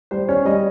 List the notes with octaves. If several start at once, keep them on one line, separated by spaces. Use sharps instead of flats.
G3 C5
C#4 C#5
G3 D#5